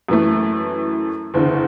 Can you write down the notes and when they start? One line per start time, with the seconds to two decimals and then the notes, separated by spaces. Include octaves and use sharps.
0.09 F#2 E3 A3
1.34 F#1 E2 D3